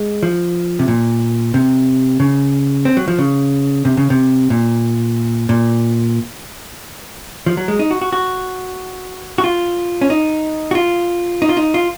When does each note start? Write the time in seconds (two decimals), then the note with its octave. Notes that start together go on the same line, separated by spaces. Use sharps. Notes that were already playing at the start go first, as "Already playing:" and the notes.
Already playing: G#3
0.23 F3
0.79 C3
0.88 A#2
1.54 C3
2.20 C#3
2.85 C4
2.97 F#3
3.08 F3
3.19 C#3
3.85 C3
3.97 C#3
4.10 C3
4.50 A#2
5.49 A#2
7.46 F3
7.57 F#3
7.68 G#3
7.79 D#4
7.91 F#4
8.01 F#4
8.13 F#4
9.38 F#4
9.44 F4
10.01 C#4
10.10 D#4
10.71 F#4
10.75 F4
11.42 D#4
11.49 F4
11.57 D#4
11.74 F4